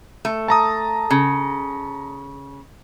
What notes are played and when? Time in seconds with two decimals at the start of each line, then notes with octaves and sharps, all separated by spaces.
0.25 A3
0.48 A5 A#5 D#6
1.11 C#3